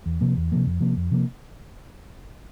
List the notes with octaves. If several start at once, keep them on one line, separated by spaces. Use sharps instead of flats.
E2
C3 F3 A#3
E2
C3 F3 A#3
F2
C3 F3 A#3
F2
C3 F3 A#3